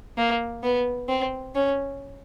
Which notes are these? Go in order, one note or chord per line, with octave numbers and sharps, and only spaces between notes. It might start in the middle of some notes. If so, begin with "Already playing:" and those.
A#3
B3
C4
C#4